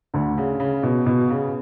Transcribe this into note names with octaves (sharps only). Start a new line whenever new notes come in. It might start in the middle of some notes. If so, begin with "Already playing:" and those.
D2 D3
C#3
C#3
B2
B2
C#3